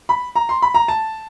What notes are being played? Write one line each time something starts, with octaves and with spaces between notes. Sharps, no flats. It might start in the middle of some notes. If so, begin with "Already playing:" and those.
B5
A#5
C6
B5
A#5
A5